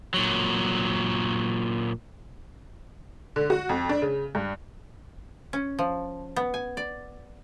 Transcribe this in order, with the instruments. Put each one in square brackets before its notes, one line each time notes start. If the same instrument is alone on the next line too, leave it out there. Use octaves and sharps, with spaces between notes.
[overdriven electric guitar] A#2 F#3
[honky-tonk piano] D3
F#4
F2
D4
C#3
G2
[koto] C#4
F3
B3
G#5
D5